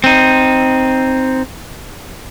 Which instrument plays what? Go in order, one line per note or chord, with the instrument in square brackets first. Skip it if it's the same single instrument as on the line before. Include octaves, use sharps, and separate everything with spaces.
[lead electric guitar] C4 D#4